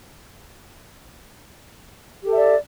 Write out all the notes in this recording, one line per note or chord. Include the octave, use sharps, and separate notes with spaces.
G4 A4 D5 E5